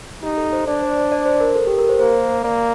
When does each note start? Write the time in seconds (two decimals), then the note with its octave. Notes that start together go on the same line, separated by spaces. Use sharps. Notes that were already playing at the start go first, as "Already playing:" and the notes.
0.23 D#4 G4
0.37 A4
0.53 C5
0.67 D4 D5
0.82 C5
0.97 C5
1.12 D5
1.26 C5
1.40 A#4
1.55 A4
1.67 G4
1.78 A#4
1.89 C5
1.99 A#3 C5
2.44 A#3 D5